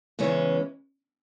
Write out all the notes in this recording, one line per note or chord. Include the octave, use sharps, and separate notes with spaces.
E2 C#3 E3 G#3 C#4